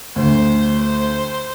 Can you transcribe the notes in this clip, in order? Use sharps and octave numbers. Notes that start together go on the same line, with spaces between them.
D2 C5
C5